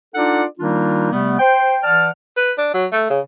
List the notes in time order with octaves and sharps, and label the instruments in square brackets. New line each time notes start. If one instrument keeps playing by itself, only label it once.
[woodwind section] D4 D#4 F4 A4 D5 F#5
D#3 G3 A#3 D4 D#4 F4
C3 G3 A3 B3
C5 G5
E3 D5 F#5 A5 F6
[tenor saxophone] B4
D4
F#3
A3
C#3